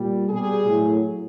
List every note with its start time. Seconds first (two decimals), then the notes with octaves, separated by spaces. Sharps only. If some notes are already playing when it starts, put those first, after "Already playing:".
Already playing: A#2 G3
0.29 B2 G3 G#4
0.66 A2 F#3